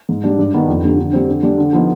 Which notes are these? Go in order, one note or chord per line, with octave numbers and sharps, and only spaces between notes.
G#2
G3 D4
G2
D#3 B3 D4
F2
D3 G3
D3
G3 C4
D3
G3 D4
D3
F3 B3 D#4